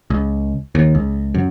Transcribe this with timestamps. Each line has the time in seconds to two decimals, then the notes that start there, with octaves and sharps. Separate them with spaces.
0.10 C#2
0.75 D#2
0.95 C#2
1.35 F#2